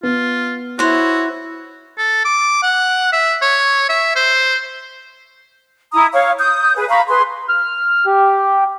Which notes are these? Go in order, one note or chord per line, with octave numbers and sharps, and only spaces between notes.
B3 F4
E4 F#4 C5 C#5
A4
D6
F#5
E5
C#5
E5
C5
E4 A#5 D#6
C#5 F5 C#6
D#6 G6
G#4 B4
F5 A#5 B5 C#6
G#4 B4 C6
F6
G4